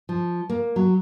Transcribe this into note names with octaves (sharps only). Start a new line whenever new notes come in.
F3
A#3
F#3